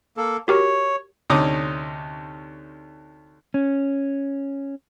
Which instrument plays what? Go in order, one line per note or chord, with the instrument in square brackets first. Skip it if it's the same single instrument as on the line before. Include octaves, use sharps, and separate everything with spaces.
[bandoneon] A#3 A4
[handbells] F#4 G4 A#4 [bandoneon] C#5
[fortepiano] D2 C3 C#4 D#4 D6 D#6
[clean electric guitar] C#4